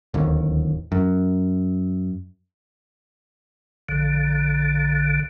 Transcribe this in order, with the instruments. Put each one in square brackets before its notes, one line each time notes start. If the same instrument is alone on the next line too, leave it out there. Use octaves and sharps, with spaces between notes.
[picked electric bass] D1 D#2
F#2
[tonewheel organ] A#1 D3